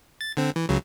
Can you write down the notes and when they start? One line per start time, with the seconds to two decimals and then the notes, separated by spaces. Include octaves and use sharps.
0.21 A6
0.37 D3 C4
0.56 E3
0.69 C#2 C#3 F#3